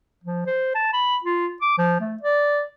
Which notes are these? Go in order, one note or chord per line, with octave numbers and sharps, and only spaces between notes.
F3
C5
A5
B5
F4
D6
F3
A3
D5